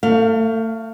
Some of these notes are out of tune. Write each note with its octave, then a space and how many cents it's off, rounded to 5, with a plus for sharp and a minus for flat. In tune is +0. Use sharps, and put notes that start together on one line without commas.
A3 +30 F5 +0